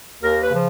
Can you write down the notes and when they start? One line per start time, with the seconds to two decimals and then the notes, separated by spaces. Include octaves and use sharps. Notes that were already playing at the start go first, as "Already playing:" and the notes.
0.22 D#2 A#4
0.42 B4
0.51 C#3 F3